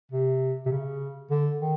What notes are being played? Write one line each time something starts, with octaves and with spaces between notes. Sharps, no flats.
C3
C3
C#3
D3
D#3